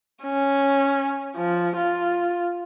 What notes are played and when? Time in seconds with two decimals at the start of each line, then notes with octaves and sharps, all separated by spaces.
0.23 C#4
1.36 F3
1.76 F4